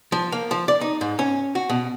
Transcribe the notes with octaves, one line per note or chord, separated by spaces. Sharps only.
F3
A#3
F3
D5
D#4
G#2
C#4
F#4
B2